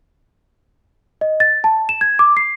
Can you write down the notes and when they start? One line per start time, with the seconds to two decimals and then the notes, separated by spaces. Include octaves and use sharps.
1.21 D#5
1.40 A6
1.64 A5
1.89 E7
2.01 G#6
2.19 D6
2.37 C7